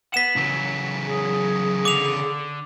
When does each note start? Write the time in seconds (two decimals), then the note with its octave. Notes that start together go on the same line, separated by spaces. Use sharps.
0.14 B4 F#5 B6 E7
0.36 C#3 E3 F#3
1.06 G#4
1.85 D3 D6 F7